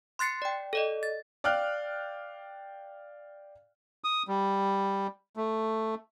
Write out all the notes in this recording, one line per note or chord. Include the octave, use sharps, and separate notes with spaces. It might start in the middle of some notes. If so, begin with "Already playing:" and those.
C6 F#6 A6 C7 C#7
D5 G5
A4 D5 D#5
A6
D5 F5 G5 F6 F#6
D#6
G3
A3